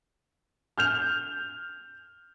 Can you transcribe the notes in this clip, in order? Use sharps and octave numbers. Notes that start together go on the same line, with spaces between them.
F6 G6 F7